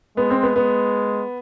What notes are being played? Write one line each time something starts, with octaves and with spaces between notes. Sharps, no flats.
G#3 B3
C4
B3
G#3 B3